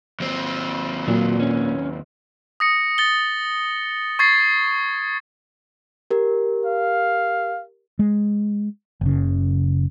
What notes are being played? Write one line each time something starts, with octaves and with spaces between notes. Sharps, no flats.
D#2 C4
A#2 F#3
C#4
D#6 A#6 C#7
A6 G7
C#6 G#6 A6 C7
G4 A#4
F5
G#3
F#1 C#3